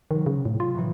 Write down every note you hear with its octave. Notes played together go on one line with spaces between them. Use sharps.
C3 D#3 F#3
C#3
A2
F4
A2 D#3 E3